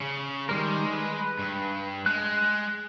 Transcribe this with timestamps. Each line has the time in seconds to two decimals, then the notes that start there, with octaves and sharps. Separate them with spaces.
0.01 C#3
0.49 D#3 G3 G#3 A#4
0.93 B4
1.39 G2
2.06 G#3 F#6